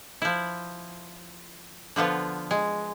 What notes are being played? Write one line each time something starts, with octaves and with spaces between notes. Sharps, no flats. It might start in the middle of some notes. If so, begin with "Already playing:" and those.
F3 E4
D3 F3 B3 F4
G#3